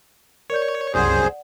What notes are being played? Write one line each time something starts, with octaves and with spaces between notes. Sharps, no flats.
A#4 C#5 D5 G6
C2 F#2 G#4 C5 D5 F#5